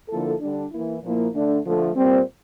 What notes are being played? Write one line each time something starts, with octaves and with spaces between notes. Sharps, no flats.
D3 F3 A#3 E4 A4
D3 G3 D4
E3 A#3 E4
A#2 F3 A#3 E4
D3 A3 D4
D3 F3 A3
A#2 G3 C4